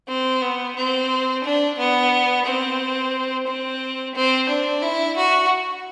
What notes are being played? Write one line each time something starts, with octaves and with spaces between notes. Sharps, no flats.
C4
B3
C4
D4
B3
C4
C4
C4
D4
E4
F#4